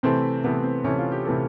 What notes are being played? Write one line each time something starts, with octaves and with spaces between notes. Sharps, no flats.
C3 E3 A3 C4
C3 E3 A3 B3
C4
C3 E3 A3 C#4
F4
G4
C3 E3 A3